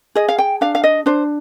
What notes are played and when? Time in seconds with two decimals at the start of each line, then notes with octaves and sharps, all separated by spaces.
0.15 G#4 D#5
0.28 F5
0.38 G5
0.61 D4 F5
0.75 F5
0.84 D#5
1.06 D4 C5